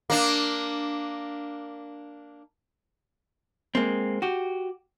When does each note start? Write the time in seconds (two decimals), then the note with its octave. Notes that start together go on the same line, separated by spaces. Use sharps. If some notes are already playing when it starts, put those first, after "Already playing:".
0.10 A#3 D4
3.75 G#3 A#3 C4
4.22 F#4 G4